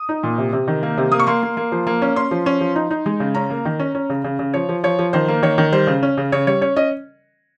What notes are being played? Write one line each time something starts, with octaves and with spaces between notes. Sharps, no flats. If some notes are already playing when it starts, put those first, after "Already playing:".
Already playing: D#6
D#4
A#2
C3
C3
D#3
A#3
C3
A#3 D#6
C#6
A#3 C6
A#3
A#3
F3
A#3
C#4
C#4 C6
F3
C#4
F3
D#4
D#4
G#3
C#3
C#4 A#5
A#3
D#3
C#4
C#4
C#3
C#3
C#3
F3 C#5
F3
F3 C#5
F3
D#3 C5
A#3
D#3 C#5
D#3
G3 C5
C#3
C#4
C#3
C#3 C#5
G3 C#5
C#4 C#5
C#4 D#5